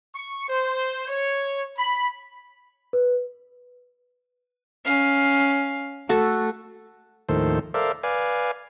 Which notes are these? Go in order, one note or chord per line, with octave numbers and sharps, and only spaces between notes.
C#6
C5
C#5
B5
B4
C#4 F5
A3 F#4 A4
D#2 A2 D#3 F3 A4 C5
A4 A#4 C5 D5 E5 F5
B4 D5 F5 G#5